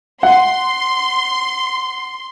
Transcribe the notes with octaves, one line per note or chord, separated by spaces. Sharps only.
F#5 C6